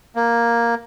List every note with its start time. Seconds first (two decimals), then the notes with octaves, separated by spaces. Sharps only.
0.16 A#3